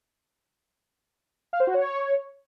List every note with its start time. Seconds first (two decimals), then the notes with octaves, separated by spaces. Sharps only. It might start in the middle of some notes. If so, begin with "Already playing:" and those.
1.53 F5
1.60 C5
1.67 F#4
1.74 C#5